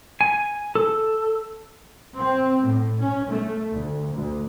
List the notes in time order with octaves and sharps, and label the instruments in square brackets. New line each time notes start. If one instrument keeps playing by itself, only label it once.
[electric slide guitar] G#5
A4
[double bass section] C4
A2
C#4
A3
D2
D2